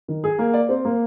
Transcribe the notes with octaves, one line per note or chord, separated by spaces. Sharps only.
D#3
G#4
A#3
D5
C4
A#3